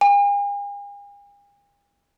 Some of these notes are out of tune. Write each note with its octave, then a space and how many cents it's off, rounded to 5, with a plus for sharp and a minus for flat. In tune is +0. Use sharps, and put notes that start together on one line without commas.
G#5 -45